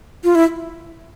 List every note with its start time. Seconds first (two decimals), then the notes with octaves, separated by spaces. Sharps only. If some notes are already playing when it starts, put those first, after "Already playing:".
0.24 F4
0.35 E4